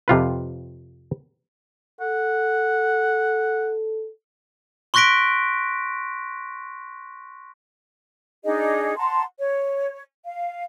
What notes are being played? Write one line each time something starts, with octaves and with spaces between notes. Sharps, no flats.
F2 C3 F4 B4
A4 F#5
C6 C#6 F#6 A#6 B6 D7
D4 D#4 G#4 D#5
F#5 A5 A#5 C6
C#5
F5